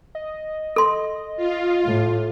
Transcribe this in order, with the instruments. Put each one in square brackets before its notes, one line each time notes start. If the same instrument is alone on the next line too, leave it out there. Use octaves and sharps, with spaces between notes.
[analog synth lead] D#5
[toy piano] A4 C6
[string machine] F4
[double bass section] A2